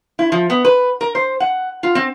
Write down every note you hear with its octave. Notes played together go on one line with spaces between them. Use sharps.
E4
F3
B3
B4
A#4
C5
F#5
F4
C4